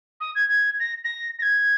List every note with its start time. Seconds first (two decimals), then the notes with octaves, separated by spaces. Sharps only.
0.20 D#6
0.35 G#6
0.49 G#6
0.80 A#6
1.04 A#6
1.38 A#6
1.42 G#6